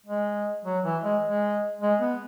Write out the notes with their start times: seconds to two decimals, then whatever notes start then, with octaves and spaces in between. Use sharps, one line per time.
0.06 G#3
0.65 F#3
0.84 E3
1.03 G#3
1.22 G#3
1.81 G#3
2.01 B3